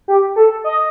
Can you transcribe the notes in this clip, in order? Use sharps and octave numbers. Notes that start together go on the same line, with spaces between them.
G4
A4
D#5